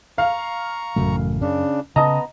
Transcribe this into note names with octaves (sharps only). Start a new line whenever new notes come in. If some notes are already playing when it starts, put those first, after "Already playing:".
F5 A#5 C#6
A1 F#2 C#3 A3
C#3 C#4 D4
C#3 B3 D#5 A5 A#5 D#6